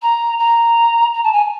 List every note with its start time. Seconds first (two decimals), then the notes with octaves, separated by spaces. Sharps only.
0.02 A#5
0.38 A#5
1.13 A#5
1.23 A5
1.32 G#5